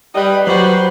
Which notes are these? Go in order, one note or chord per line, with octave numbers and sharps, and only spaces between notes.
G3 B4 D#5
F#3 F#4 G4 B4 C5